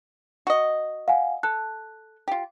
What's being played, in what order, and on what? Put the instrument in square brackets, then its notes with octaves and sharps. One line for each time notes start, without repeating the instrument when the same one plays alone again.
[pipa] F#4 D#5
[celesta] F5 F#5 G#5
[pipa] A4 [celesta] F#6
[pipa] F4 G4